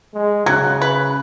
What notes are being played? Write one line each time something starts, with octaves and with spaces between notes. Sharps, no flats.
G#3
C#3 F#3 F#6 G#6
B4